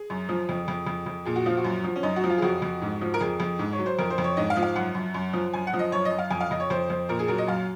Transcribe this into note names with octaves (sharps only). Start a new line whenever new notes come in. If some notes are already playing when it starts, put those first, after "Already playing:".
Already playing: G#4
F#2
F3
F2
F2
F2
F2
A#2 G#4
F#4
F3 F4
F#4
F#2
F3
C#4
F#2 D#4
F#4
F3
F4
G#4
F2 F#4
F2
G#2
F3
A#4
F2 G#4
F2
G#2
C#5
F#3
C5
F2 A#4
C5
F2
C#5
G#2 D#5
F5
F3
F5
F#2 F#5
F#2
F#2
F3
F#2 G#5
F#5
F3
D#5
F#2 C#5
D#5
F#2
F5
F2 G#5
F5
F2 D#5
C#5
F2 C5
F2 C5
A#2 A#4
G#4
F#3 A#4
D#5
F#2 F5